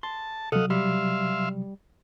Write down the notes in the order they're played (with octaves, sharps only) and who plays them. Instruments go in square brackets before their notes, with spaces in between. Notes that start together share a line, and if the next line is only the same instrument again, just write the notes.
[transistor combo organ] A5 [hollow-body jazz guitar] C6
[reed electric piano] C3 F#3 [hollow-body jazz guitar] A4 [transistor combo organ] D#5 F5 F#5
[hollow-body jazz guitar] G3 [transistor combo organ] E5 F5 C6